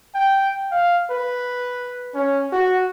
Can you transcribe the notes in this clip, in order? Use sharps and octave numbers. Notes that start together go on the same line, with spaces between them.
G5
F5
B4
C#4
F#4